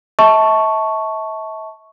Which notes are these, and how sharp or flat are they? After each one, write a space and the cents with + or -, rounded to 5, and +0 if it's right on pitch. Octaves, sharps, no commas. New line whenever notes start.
E5 -40 A5 +0 C#6 +0